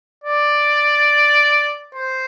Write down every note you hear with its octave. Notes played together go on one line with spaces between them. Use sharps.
D5
C5